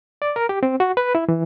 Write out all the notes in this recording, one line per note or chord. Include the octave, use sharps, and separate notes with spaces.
D5
A#4
G4
C4
F#4
B4
E4
E3